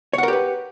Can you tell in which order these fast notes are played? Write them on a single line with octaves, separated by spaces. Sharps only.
C#5 F#5 A#4 G4 B4